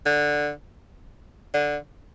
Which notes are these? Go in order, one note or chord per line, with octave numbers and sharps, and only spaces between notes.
D3
D3